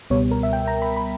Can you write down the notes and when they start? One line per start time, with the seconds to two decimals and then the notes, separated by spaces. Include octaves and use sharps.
0.10 C#2 B2 G3 B3 C#5
0.31 A#4
0.43 E5
0.53 G5
0.68 A#5
0.82 B5
0.96 B5